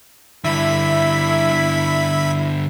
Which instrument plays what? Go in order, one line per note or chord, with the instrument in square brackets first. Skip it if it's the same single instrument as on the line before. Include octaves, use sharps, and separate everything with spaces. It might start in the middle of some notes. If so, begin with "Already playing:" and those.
[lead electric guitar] G2 D3 [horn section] E4 [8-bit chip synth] E5 B5